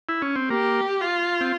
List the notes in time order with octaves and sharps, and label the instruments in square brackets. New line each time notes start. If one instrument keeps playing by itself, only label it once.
[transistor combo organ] E4
C#4
C4
[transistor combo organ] A#3 [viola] G4
[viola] F4
[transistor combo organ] C4